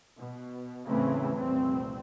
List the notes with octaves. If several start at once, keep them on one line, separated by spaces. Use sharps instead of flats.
B2
E2 A2 C#3 E3 A3 C4
F1 C2 A#2 C4